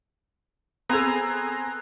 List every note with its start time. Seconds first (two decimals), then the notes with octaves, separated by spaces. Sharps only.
0.90 B3 C4 G#4 A4 G#5 A#5